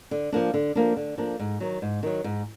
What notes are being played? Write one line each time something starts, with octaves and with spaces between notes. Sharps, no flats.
D3
F3 A#3 D4
D3
F3 A#3 D4
D3
F3 A#3 D4
G#2
D#3 F#3
G#2
D#3 F#3
G#2